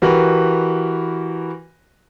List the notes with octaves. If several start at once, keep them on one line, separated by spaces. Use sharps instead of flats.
E3 F#4 G4 A#4 B4